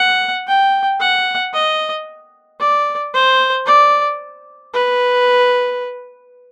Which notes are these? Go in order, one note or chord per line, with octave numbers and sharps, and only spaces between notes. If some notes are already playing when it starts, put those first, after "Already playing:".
Already playing: F#5
G5
F#5
D#5
D5
C5
D5
B4